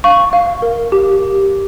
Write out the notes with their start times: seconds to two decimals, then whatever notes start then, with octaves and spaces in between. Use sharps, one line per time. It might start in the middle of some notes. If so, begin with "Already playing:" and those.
0.04 F5 C#6
0.33 F5
0.62 A#4
0.92 G4